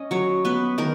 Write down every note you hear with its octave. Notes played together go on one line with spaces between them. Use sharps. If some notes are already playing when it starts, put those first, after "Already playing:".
Already playing: C#4 D#5
F#3 C#5
B3 B4
D#3 A#4